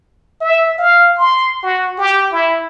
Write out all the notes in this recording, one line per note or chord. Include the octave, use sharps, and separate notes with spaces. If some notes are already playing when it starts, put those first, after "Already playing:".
E5
F5
C6
F#4
G4
E4